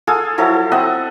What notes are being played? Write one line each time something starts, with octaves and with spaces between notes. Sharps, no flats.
F4 G#4 A4 G#5
F3 F#3 E4 A4
C4 D#5 E5 F#5